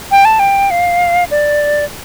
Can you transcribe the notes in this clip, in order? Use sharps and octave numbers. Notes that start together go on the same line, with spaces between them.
G5
A5
G5
F5
D5